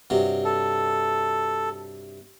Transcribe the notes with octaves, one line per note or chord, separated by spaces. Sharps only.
G2 C3 F#3
A4